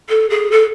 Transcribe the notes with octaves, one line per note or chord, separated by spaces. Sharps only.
A4
G#4
A4